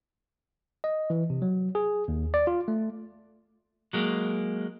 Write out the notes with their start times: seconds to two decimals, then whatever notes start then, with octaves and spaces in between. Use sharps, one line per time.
0.84 D#5
1.10 E3
1.30 C3
1.42 F#3
1.75 G#4
2.08 D#2
2.34 D5
2.47 F4
2.68 A3
3.93 F#3 G#3 A#3